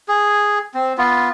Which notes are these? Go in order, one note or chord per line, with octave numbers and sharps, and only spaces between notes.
G#4
C4
B3 F4